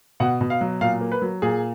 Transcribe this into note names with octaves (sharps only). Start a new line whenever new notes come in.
B2 F#5
B2
F5
F#3
A#2 F5
A#3
B4
F#3
A#2 G#4